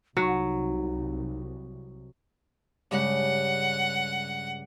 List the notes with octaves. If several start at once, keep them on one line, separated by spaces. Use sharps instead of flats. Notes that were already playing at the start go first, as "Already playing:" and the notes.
C2 F#3 D#4 F#4
G2 C#3 G#3 F#5